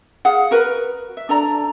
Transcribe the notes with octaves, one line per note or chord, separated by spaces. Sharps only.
G#4 F5 F#5
F#4 A#4 B4
E5
D4 A4 D5 A#5